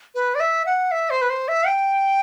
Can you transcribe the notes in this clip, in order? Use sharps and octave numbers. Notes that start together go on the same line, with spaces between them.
B4
D5
E5
F#5
E5
C5
B4
C5
E5
G5